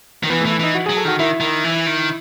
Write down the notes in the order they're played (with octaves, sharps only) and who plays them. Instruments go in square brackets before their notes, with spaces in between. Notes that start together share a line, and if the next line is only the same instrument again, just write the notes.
[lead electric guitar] D#3
[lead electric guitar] E3 [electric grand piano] B3 B4
[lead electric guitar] E3 [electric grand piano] A3 A4
[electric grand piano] E4 E5
[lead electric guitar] E3 [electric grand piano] D#4 D#5
[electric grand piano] F#4 F#5
[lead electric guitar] F#3 [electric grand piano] G#4 G#5
[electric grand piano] A4 A5
[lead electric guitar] D#3 [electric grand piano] F#4 F#5
[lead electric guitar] D#3 [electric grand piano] E4 E5
[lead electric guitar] D#3
E3
D#3